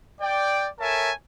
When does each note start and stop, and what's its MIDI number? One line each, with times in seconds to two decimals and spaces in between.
0.21 0.67 74
0.21 0.67 79
0.80 1.11 69
0.80 1.11 70
0.80 1.11 73
0.80 1.11 76
0.80 1.11 80
0.80 1.11 81